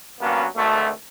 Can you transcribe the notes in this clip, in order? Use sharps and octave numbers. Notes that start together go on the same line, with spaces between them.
G2 F#3 A#3 B3 C#4
G#1 D2 A3